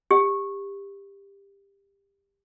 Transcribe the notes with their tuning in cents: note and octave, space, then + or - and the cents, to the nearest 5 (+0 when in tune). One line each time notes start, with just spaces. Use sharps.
G4 +20